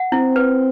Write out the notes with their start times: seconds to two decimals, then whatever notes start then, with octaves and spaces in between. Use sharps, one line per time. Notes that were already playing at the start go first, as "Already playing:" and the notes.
Already playing: F#5
0.12 C4 E4
0.36 B4